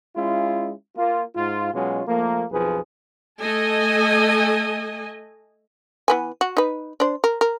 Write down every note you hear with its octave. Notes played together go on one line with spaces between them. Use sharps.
G#3 C#4 E4 F4
A#3 F4
G#2 F4
B2 F#3 G#3 C#4 F4
F3 A3 A#3
B1 F2 F3 G#4 B4
A3 A4 D#5 G#5
E3 B3 G#5
F#4
D#4 B4
D4 C5
A#4
A#4